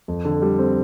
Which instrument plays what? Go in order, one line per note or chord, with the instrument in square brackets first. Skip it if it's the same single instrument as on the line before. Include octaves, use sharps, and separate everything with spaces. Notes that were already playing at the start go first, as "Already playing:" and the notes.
[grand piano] F2
D3
G3
C4